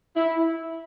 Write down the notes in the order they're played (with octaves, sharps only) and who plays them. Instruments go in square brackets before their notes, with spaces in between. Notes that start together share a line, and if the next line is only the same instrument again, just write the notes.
[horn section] E4